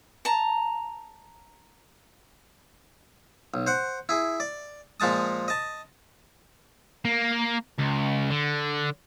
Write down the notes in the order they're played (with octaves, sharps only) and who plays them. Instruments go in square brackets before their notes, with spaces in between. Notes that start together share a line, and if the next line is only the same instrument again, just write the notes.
[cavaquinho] A5 A#5
[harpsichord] B1
C5 F#5
E4 G#4
D5
A#2 F3 G#3 A5 D#6
D#5 A5
[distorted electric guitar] A#3
C#2
D3